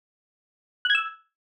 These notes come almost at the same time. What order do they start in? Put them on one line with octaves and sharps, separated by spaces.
F#6 G#6 E6